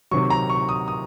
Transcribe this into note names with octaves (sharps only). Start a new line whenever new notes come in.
C3 D#3 F#3 C#6
A#5
C#6
D#6
D#6